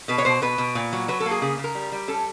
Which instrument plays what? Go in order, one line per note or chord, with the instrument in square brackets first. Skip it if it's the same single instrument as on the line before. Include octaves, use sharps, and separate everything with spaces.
[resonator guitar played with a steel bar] B2 B4
C#5
B2 C5
B2 B4
B2
A#2
F#3
F#3 B4
A4
A#3
G#4
C#3 G#4
C#3
A#4
G3
G3
C#4 A4